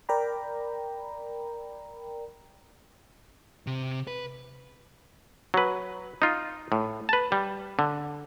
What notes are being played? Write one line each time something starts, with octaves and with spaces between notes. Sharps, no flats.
A#4 D5 G5 A#5 B5
C3
B4
F#3 B4
D#4 F4
A2
B4 A5
G3
D3